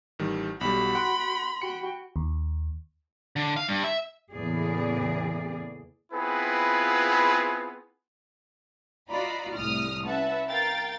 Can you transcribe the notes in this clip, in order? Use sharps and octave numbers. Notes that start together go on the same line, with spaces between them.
A1 D#3 G3
B1 G3 F#4 B5
F#5 G5 C6
F#4 G5 C#7
D#2
D3
F5
G2
E5
E2 A2 C#3 A#3 G#4 D5
B3 C4 E4 F4 G#4 B4
F4 F#4 D5 D#5 A#5 B5
C2 A2 D#6 F6
C#4 B4 E5 F#5 A5
A#4 F5 G5 A6